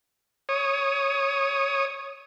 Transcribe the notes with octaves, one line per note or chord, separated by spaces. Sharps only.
C#5 D#6